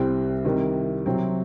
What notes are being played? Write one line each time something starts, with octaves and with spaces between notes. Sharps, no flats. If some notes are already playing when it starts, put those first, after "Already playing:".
Already playing: C2 C3 G3 C4
C3 D#3 G3
C3 F#3 C4